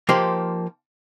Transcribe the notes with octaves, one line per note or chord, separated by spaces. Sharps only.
F3 A#3 D#4 G4 C5